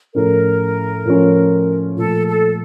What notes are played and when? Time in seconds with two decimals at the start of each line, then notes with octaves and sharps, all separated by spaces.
0.14 A2 F3 C#4 A#4
1.05 A2 F3 C#4
1.97 A#2 F3 A3 A4
2.27 A4